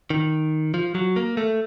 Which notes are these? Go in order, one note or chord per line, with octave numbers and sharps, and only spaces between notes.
D#3
F3
F#3
A#3
A3